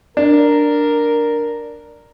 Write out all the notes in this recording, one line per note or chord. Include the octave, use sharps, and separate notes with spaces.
D4 A#4